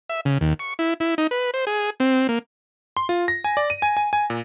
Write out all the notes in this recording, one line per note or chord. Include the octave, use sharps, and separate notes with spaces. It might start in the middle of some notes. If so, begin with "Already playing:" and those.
E5
C#3
D#2
C#6
E4
E4
D#4
B4
C5
G#4
C4
A#3
C6
F4
A#6
G#5
D5
D#7
G#5
G#5
G#5
A#2